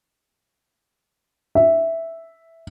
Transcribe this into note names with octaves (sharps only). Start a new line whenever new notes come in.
E5